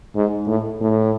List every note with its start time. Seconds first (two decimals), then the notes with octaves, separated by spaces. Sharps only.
0.15 G#2
0.48 A2
0.81 A2